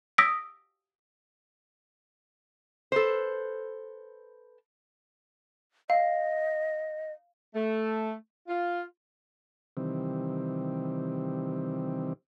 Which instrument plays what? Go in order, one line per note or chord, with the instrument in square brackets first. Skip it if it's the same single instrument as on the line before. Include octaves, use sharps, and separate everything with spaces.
[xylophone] D#6 E6 A#6 B6 D7
[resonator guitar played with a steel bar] A4 B4 C5
[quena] D#5 [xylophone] F5
[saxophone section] A3
F4
[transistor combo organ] C3 D#3 E3 G3 C4